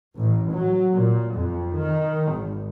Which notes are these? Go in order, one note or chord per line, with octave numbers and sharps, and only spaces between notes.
A1
F#3
A#2
F2
D#3
G#1